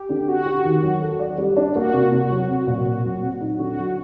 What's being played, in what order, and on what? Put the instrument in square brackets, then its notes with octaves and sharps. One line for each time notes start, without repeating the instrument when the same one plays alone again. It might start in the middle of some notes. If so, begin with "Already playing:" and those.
Already playing: [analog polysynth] G4
[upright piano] D3
[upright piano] C4 [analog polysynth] F#4
[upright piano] G4
D#3
F#3
A4
D5
G3
D4
[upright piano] A#3 [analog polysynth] F#4
[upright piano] C3
[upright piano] C3 [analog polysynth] F#4
[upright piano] F#3
C4
A#2
A#2
F#3
C4
D#4
[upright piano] D3 [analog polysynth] F#4
[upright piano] F#3